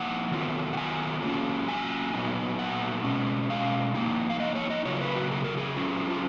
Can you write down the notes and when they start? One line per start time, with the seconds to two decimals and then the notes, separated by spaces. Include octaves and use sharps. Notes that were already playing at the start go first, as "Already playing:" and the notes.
Already playing: F3 A#3 D#4 F#5
0.31 D#3 F#3 B3 F4
0.73 F#5
0.77 G#5
1.23 F#3 A#3 C#4 F4
1.68 G#5
2.14 A#2 F#3 B3 D#4
2.59 F#5
3.04 B2 G#3 C#4
3.50 F5
3.95 F3 A#3 D#4
4.30 F5
4.40 D#5
4.55 C#5
4.70 D#5
4.85 C#3 F#3 A#3 F4 C#5
4.96 C#5
5.01 B4
5.15 F#4
5.31 G#4
5.44 A#4
5.57 G#4
5.76 F#3 C#4 F4
6.10 F4